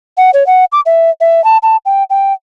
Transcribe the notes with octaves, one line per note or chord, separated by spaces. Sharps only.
F#5
C#5
F#5
D6
E5
E5
A5
A5
G5
G5